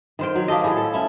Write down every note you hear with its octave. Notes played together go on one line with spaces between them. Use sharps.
D#3 C5 G5
F#3
A#3 G4 A4 D#5
A2 G#4
A4
C#4 E4